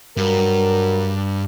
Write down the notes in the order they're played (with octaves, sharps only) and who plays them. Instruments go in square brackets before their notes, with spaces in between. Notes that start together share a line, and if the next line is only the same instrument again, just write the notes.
[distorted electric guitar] G2 [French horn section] F#3 F#4 A#4